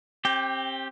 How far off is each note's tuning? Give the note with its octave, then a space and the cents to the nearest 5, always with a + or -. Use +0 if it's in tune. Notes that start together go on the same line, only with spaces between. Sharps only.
C4 +30 G4 +0